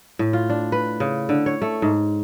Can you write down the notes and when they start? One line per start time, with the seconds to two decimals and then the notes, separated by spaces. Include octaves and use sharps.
0.19 A2
0.33 F4
0.50 D4
0.72 B4
1.00 C#3
1.29 D3
1.46 C#5
1.62 A3
1.82 G#2